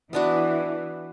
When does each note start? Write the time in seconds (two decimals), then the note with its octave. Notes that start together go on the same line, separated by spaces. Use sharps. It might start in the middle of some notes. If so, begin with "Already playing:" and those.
0.13 E3 B3 D4 F#4